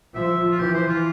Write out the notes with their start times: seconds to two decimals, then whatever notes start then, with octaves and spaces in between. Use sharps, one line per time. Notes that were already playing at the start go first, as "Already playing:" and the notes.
0.15 F3 E5
0.52 F4
0.59 E3 G4
0.74 C5
0.88 F4